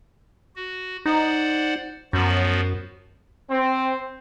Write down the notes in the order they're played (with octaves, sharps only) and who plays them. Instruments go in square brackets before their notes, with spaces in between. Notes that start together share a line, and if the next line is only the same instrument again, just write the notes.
[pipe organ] F#4
[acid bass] D#4 [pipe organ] C5 D5 F#5
[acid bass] F#2 [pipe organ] F3 B3 F#4
[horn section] C4